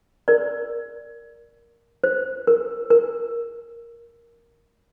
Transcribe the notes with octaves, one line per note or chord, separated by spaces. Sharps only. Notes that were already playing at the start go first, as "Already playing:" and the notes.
A#4 D5
C5
A#4
A#4